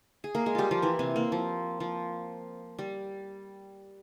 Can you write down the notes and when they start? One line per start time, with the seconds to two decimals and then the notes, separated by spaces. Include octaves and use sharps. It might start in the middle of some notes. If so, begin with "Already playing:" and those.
0.24 G#4
0.35 A#3 A#4
0.46 G#3 G#4
0.55 G3 F4 G4
0.71 F3 F4
0.82 E3 E4
0.99 C3 C4
1.16 A#3
1.32 F3
1.80 F3
2.78 G3